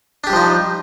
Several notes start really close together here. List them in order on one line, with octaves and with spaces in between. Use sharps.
D4 G4 G3 F3 D#4